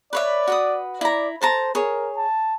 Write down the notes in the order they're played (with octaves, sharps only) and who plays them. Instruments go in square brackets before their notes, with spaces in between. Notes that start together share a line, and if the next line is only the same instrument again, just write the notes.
[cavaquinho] B4 C#5 E5 [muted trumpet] D5
[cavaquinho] F#4 B4 D#6
[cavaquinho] E4 A#5 [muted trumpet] D5
[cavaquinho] A4 A5 A#5 [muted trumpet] C5
[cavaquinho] G#4 C#5 [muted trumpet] A#4
[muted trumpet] A5